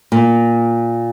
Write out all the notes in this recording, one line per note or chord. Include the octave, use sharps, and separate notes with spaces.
A#2